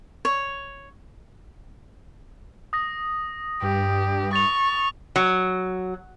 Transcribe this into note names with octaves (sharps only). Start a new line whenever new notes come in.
C#5
D#6 A#6
G2 G4
C#6 A6 F7
F#3